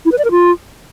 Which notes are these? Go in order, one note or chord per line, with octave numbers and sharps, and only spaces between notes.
E4
B4
D5
A#4
F4